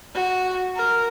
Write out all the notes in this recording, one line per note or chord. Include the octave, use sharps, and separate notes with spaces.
F#4
A#4